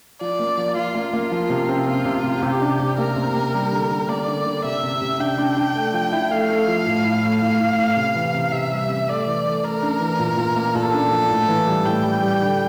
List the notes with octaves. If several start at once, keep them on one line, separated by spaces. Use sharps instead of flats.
F3 D5
A#3
F3
F3 F4
A#3
A#3
F3
C3
C4
C4 F4
C3
C3
C3 G4
D4
C3
A#3 A#4
C3
A#3
G3
D3
D3
A#3 D5
D3
D3
C3 E5
C3
C3
D4 G5
D4
D4
A3
F3
E4
A3 F5
A3
F3
A2
A2
A2
A2 F5
A2
A2
C3
E3
C3
C3 E5
G3
C3
A3 D5
E3
A3
A3 A#4
D4
E3
A#2
A#2
A#3
A#2 A4
D4
F3
A2
E3
G3
A2 G5
G3
G3
D3